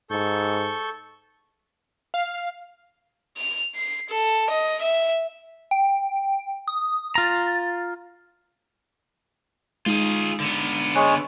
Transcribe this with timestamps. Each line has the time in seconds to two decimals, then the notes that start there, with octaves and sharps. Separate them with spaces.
0.10 G#2 A4 C#6 G6
2.14 F5
3.37 F7
3.75 C7
4.09 A4
4.50 D#5
4.81 E5
5.71 G5
6.68 D#6
7.15 F4 A#5 A6
9.86 G#3 D#4 F4 G#4
10.40 D3 B3
10.95 G#3 C#5 G#5 C#6 F#6